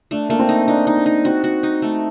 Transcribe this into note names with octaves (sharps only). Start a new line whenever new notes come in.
A3 D4
A3 A#3
C4
D#4
D4 D#4
D#4
D4
D#4
C4 F#4
F#4
D#4
A3